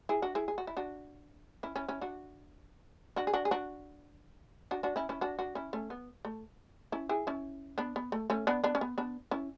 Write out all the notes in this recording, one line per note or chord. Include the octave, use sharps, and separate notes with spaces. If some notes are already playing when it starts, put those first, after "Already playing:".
E4 G#4
D4 F#4
E4 G#4
G#4
F#4
E4
D4 F#4
C#4 E4
C#4 E4
C#4 E4
D4 F#4
D4 F#4
G#4
D4 F#4
G#4
D4 F#4
D4 F#4
D4 F#4
C#4 E4
C#4 E4
D4 F#4
D4 F#4
C#4 E4
A3 C#4
B3
A3
C#4 E4
E4 G#4
C#4 E4
B3 D4
B3
A3
A3 C#4
B3 D4
B3 D4
C#4
B3
B3 D4
C#4 E4